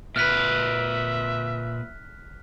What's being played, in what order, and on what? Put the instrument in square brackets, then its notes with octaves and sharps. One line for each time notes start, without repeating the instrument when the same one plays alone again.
[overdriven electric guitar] A#2 B4 [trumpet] E5 [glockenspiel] F6 F#6 B6